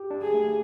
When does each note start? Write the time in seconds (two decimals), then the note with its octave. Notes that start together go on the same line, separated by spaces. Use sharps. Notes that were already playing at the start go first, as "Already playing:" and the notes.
Already playing: G4
0.11 D4
0.22 G#4
0.34 A3